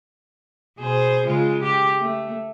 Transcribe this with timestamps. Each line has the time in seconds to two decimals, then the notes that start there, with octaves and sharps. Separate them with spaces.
0.78 B2 G#4 C5
1.25 C#3 G#3 F4
1.63 G4
1.98 A3